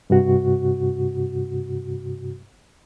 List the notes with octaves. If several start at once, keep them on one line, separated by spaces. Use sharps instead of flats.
G2 C3 F#4